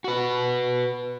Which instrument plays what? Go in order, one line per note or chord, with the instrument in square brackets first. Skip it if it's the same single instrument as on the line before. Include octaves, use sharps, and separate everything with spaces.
[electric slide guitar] F#4 B4